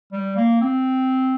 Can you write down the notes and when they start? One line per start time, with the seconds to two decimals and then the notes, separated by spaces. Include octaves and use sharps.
0.12 G3
0.36 A#3
0.61 C4